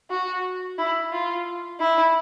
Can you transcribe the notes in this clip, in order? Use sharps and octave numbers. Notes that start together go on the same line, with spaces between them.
F#4
E4
F4
E4